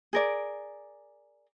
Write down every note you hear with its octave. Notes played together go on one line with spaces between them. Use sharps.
G#4 A#4 D5